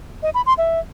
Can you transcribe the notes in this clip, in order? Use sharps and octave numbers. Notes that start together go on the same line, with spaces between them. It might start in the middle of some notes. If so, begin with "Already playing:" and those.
D#5
B5
C6
E5